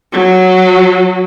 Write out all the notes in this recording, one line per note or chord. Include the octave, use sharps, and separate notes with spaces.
F#3